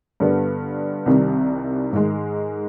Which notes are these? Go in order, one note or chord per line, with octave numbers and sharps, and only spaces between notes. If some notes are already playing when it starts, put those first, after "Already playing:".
G2 D3 G3 B3
C2 C3 D#3 G3
G#2 D#3 G#3